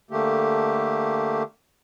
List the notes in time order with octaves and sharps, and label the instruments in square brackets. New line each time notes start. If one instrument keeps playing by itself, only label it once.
[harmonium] D3 A3 A#3 G4